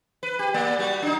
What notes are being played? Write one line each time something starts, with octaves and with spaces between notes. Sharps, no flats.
B4
G4
A#3 D5
G3 F#4
D4 D#4